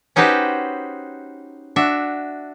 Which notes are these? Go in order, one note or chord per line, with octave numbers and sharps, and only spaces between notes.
C#4 D#4 F#4 G4 B4 C5
D4 F#4 E5